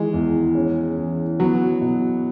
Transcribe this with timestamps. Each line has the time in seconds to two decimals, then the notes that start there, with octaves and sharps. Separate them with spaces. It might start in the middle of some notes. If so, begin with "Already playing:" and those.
Already playing: D#3 E3 G#3
0.13 E2
0.55 C#4
0.98 E3
1.39 F#3 B3
1.81 B2